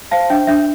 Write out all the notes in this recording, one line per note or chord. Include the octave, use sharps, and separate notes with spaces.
C5 F5 A5
D4 E5 G5
D4 E5